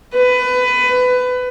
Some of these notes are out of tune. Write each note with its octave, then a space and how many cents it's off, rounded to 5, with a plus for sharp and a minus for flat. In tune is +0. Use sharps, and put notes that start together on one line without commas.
B4 +20